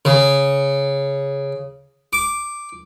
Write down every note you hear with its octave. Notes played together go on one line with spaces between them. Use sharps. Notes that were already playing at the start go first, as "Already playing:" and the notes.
C#3
D6